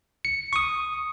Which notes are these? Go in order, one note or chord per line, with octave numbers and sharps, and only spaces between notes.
C#7
C#6 D#6